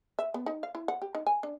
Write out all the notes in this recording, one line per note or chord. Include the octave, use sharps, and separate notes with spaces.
E5
B3
D#4
F5
E4
F#5
G4
D#4
G#5
D4